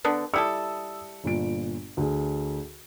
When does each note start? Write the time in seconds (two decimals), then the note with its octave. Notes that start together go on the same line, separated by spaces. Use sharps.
0.04 D3 B3 D4
0.34 G3 E4 A4 D#6 E6 C#7
1.24 G1 A#2 D7
1.97 D2 G#4